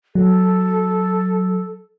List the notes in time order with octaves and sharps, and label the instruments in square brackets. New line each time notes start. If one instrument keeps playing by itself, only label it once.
[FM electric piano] F#3 [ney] A4